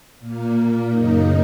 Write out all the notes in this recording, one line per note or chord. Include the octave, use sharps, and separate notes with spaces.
A#2 A#3
F#2 C#3 A#3 D#4